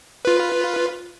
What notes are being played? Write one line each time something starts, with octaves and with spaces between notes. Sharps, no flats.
F4 B4